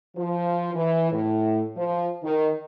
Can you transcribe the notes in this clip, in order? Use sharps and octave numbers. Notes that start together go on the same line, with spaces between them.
F3
E3
A2
F3
D#3